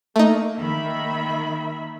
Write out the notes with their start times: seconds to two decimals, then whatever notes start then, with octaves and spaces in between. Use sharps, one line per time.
0.16 A3 A#3 D#4
0.60 D#3 A#3 E5 B5